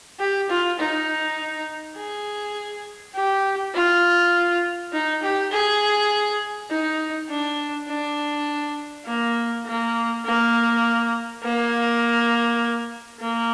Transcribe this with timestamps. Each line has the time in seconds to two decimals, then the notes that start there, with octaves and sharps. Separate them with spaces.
0.20 G4
0.50 F4
0.79 D#4
1.96 G#4
3.15 G4
3.74 F4
4.92 D#4
5.23 G4
5.52 G#4
6.71 D#4
7.30 D4
7.88 D4
9.06 A#3
9.66 A#3
10.26 A#3
11.44 A#3
13.21 A#3